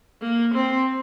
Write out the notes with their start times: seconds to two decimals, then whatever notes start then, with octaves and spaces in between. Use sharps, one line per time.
0.22 A#3
0.54 C4